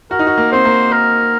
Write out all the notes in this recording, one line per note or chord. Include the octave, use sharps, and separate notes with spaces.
F#4 A#4
D#4
F#4
A#3
C4 C5
A#3
A#4